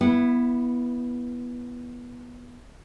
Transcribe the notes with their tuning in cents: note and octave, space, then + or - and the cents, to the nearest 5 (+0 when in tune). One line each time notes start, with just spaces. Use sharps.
B3 -15 E4 +10